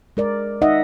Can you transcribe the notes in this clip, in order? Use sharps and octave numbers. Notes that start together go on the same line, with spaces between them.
G#3 A#4 D5
D#4 D#5 E5 F#5